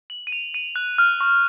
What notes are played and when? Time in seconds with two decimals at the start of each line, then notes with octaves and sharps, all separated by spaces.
0.10 F#7
0.27 D#7
0.32 F7
0.54 D#7
0.76 F#6
0.98 F6
1.21 C#6